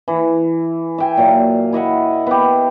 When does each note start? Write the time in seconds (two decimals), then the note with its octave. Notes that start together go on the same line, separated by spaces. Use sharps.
0.08 E3
0.98 E5 G5 G#5
1.17 A#2 F#3 F5
1.73 E4 D#5 E5 F#5
2.27 B3 G4